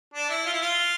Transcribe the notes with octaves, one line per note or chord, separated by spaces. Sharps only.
D4
E4
F4
E4
F4